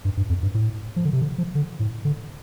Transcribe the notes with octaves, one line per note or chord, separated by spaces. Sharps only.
G2
G2
F2
G2
A2
F3
D3
C3
D3
F3
D3
A2
D3